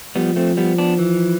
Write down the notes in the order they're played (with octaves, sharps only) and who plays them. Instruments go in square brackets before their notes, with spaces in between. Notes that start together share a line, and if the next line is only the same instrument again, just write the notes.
[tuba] F3 [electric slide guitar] G3 B3
[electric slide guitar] A3 C4
G3 B3
B3 D4
E3